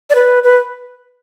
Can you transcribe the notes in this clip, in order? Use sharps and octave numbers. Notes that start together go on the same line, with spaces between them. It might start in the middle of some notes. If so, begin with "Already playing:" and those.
D5
B4
B4